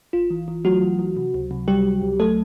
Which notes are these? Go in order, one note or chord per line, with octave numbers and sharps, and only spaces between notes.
A1 F4
E3
E3
F#3 A3 F#4
E3
E3
C3
C#2
C3
C#2 G3 G4
C#2
C#2
F#3 A3 A4